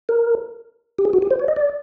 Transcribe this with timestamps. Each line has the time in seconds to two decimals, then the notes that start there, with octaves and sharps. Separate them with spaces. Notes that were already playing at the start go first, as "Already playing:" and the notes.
0.09 A#4
0.98 G4
1.05 G#4
1.13 F#4
1.22 G4
1.30 C5
1.39 C#5
1.48 D#5
1.56 D5